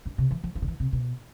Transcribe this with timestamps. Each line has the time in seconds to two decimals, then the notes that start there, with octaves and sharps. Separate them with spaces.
0.06 G2
0.18 C3
0.31 E3
0.44 F3
0.55 F3
0.62 D3
0.68 E3
0.80 C3
0.93 B2